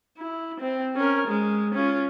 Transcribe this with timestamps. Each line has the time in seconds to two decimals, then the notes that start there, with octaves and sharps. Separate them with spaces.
0.18 E4
0.61 C4
0.96 C#4 A#4
1.28 G#3
1.75 C#4 F4